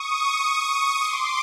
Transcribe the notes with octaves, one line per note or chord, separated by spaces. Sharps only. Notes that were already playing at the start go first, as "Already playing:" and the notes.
Already playing: C#6 D#6
C6 D6